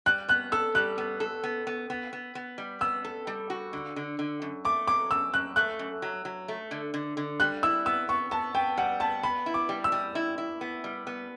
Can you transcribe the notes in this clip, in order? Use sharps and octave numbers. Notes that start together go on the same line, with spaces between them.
G3 F#6
B3 F#6
A4 E6
G3 F#6
B3
A4
B3
B3
B3
B3
B3
G3
B3 E6
A4
G3
F#4
D3
D3
D3
F#2
A3 D6
F#3 D6
F#2 E6
F#2 F#6
A3 F#6
F#2
F#3
F#3
A3
D3
D3
D3
G3 F#6
E4 E6
B3 E6
B3 C#6
B3 A5
B3 G5
G3 F#5
B3 A5
B3 B5
E4
D6
G3
E6
G3
E4
E4
B3
G3
B3